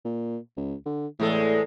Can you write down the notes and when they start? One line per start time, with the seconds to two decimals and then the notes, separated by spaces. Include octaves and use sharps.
0.05 A#2
0.57 C#2
0.86 D3
1.20 E2 A2 G#3 A4